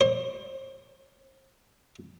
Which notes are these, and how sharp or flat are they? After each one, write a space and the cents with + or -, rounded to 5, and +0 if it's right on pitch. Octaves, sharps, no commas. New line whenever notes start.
C5 +35